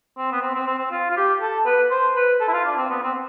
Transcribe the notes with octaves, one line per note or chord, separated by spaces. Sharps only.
C4
B3
C4
C4
C4
C4
F4
F4
G4
A4
B4
C5
B4
A4
E4
F4
D4
C4
B3
C4